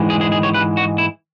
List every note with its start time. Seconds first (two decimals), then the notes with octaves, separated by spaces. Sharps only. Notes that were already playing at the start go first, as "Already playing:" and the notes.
Already playing: G#2 E3 G#3
0.10 G#4
0.21 G#4
0.32 G#4
0.43 C#5
0.54 B4
0.77 F#4
0.98 E4